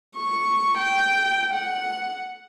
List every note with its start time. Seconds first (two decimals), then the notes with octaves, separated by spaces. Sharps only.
0.17 C#6
0.78 G5
1.54 F#5